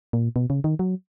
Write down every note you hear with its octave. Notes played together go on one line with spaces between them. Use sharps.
A#2
B2
C#3
D#3
F#3